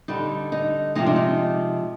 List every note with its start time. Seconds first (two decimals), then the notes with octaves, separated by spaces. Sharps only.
0.08 D3 G3 D#4
0.52 D#4
0.95 C3 F3 G#3 D#4
1.06 D4
1.16 D#4